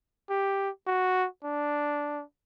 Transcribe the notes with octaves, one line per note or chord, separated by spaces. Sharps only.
G4
F#4
D4